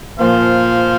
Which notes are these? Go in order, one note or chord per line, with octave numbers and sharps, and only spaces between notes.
A#2 F3 A#3 C5 F5